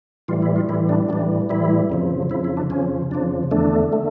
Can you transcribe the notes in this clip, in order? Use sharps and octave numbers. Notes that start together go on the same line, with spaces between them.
A2 E3 G3 F4
E4
F4
A2 E3 G3 E4
D4
A2 E3 G3 D4
A2 E3 G3 E4
F2 C#3 F3
F2 C#3 F3 E4
E4
D4
F2 C#3 F3 C#4
F2 C#3 F3 D4
E2 D3 A3 D4
D3 A3